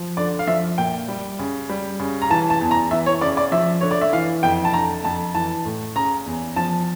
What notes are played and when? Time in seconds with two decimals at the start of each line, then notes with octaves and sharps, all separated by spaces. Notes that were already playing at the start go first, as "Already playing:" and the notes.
Already playing: F3
0.17 D3 D5
0.39 F5
0.47 F3 E5
0.78 A#2 G5
1.08 G3
1.39 C#3
1.69 G3
2.00 C#3
2.22 A#5
2.30 E3 A5
2.50 A5
2.61 E2
2.71 A#5
2.91 E3 E5
3.06 C#5
3.21 C#3 D5
3.37 D5
3.52 F3 E5
3.81 D3 C#5
3.91 D5
4.01 E5
4.13 E3 F5
4.43 F2 G5
4.65 A5
4.73 D3 A#5
5.04 F2 A5
5.34 E3 A5
5.65 A2
5.96 C#3 A#5
6.26 E2
6.56 F3 A5